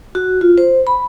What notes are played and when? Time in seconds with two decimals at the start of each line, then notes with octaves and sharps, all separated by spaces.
0.15 F#4
0.41 F4
0.58 C5
0.87 B5